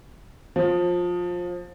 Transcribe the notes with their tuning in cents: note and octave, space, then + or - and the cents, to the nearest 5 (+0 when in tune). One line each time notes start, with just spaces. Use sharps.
F3 +20